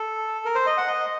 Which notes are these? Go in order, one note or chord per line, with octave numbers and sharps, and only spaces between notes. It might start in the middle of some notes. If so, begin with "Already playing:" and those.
Already playing: A4
A#4
C5
D#5
F#5
D#5